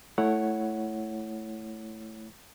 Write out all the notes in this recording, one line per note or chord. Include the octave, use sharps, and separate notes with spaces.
A3 E4 C#5 F#5